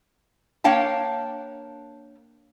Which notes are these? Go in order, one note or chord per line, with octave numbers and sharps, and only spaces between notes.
A#3 D4 C#5 F5 G5 A5